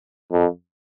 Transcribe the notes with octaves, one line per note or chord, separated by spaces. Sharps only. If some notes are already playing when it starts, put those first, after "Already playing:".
F2